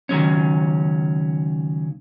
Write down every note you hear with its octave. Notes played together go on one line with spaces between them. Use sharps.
C#2 D#3 F#3 C#4